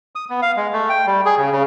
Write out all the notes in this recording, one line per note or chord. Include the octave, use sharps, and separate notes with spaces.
D#6
B3
F5
G#3
A3
G5
G3
G#4
C#3
C#3